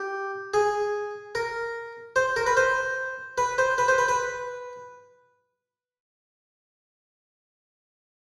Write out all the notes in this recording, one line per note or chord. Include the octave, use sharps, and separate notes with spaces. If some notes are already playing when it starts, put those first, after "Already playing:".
Already playing: G4
G#4
A#4
C5
A#4
B4
C5
B4
C5
B4
C5
B4
B4